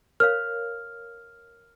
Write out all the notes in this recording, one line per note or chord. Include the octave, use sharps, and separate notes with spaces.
A#4 C#5 F5 F6